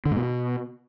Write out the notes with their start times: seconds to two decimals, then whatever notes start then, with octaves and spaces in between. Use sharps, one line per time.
0.05 D3
0.11 G#2
0.16 B2